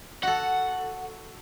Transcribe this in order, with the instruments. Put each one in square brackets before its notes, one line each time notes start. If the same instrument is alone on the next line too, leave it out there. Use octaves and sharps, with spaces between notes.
[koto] F#4 A4 [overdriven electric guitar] F#5